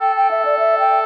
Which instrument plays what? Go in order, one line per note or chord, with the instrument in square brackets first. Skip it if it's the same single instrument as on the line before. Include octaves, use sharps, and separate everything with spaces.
[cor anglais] A4 [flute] G5
[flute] G5
E5
D5
E5
G5